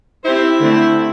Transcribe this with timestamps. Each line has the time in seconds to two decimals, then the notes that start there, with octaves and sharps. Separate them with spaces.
0.24 C4 E4 G4 C5
0.61 D3 A3 C4